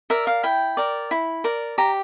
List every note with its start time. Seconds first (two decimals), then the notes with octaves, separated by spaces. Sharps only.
0.10 A#4 D5 E5
0.27 F5
0.43 E4 G5
0.77 A#4 D5
1.11 E4
1.44 A#4 D5
1.78 G4 A#5